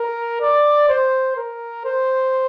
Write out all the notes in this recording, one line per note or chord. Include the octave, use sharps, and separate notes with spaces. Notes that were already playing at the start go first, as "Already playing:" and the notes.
Already playing: A#4
D5
C5
A#4
C5